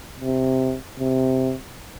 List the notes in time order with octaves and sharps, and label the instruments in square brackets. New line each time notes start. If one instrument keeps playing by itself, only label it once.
[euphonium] C3
C3